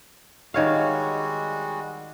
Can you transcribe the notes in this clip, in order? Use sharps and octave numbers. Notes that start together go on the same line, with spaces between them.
D#3 G3 G#3 F#4 C#5 F5